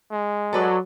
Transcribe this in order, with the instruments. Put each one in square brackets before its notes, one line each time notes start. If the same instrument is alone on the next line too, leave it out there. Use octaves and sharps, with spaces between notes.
[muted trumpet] G#3
[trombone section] F#3 [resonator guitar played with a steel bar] A4 B4 D5